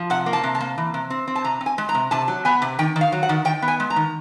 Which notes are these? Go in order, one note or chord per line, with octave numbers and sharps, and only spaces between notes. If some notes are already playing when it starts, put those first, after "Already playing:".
Already playing: F3
C3 F#5
A#3
A5
C3
A5
A#3
E3
C3
C4
C4
A5
C3 A#5
C4
G#5
G#3
A#5
C3
C3 A5
F#3
B3 G#5
C3
D#3 G5
D#3
F5
F#3
F#5
D#3
D#3 G5
B3
G#5
G#3
A#5
D#3